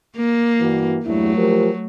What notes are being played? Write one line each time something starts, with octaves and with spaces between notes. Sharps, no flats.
A#3
G2 E3 F#4
E2 G2 F#3 A3 E4
F3 G4 A#4